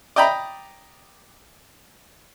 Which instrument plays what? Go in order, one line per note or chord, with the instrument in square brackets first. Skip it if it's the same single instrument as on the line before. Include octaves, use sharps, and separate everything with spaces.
[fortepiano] D5 D#5 G5 A#5 B5